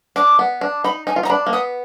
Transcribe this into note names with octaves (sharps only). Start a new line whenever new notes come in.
D4 D6
B3
D4
D#4 B5
D#4 G#5
F4
D#4 A#5
D4 B5
A#3
B3 D#6